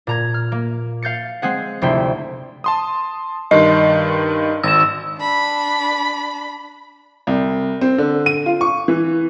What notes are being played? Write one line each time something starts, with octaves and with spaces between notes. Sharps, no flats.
A#2 A#5 G#6
F6
A#3
F5 G6 A6 C#7
G#3 C4 G#4 F#5
F1 D2 C3 E4 G5 C6
A5 C6 D#6
G2 D#3 D#5 C6
G#1 E6 E7
D4 B5
C2
C4
D3
D#7
F4
C#6
E3